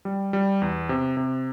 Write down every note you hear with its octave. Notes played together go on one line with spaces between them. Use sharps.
G3
G3
E2
C3
C3